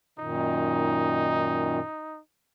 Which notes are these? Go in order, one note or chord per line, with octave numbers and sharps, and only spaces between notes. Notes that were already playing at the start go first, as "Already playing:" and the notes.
F#2 A#2 D#3 D#4